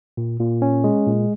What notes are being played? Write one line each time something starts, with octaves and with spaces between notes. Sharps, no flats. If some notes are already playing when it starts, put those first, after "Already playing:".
A#2
A#2
C#4
G#3
A#2